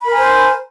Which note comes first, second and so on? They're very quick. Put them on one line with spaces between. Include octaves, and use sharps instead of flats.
B5 A#4 G#5 C5